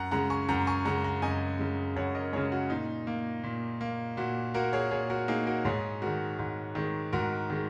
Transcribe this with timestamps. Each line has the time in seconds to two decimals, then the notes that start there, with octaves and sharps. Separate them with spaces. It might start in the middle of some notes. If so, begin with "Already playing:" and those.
Already playing: F#2 F#5 A#5
0.11 C#3 G#3 F#5 A#5
0.30 G#5 C#6
0.49 F#2 F#5 A#5
0.67 G#5 C#6
0.85 C#3 G#3 F#5 A#5
1.04 F#5 A#5
1.22 F#2 D#5 G#5
1.59 C#3 G#3
1.96 F#2 C#5 F#5
2.15 A#4 D#5
2.33 G#3 G#4 C#5
2.36 C#3
2.52 F#4
2.70 A#2 D#4
3.07 A#3
3.43 A#2
3.81 A#3
4.17 A#2 F#4
4.54 A#3 F#4 A#4
4.73 G#4 C#5
4.91 A#2 G#4 C#5
5.10 F#4 A#4
5.28 A#3 D#4 G#4
5.47 F#4 A#4
5.65 G#2 G#4 C#5
6.02 D#3 G#3 F#4 A#4
6.39 G#2
6.75 D#3 G#3
7.13 G#2 F#4 A#4
7.50 D#3 G#3